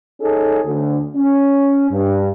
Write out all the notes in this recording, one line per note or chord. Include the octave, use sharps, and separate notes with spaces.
C#4 D#4 G#4 A4
D2
C#4
G2